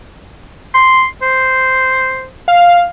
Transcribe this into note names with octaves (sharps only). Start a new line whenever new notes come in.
C6
C5
F5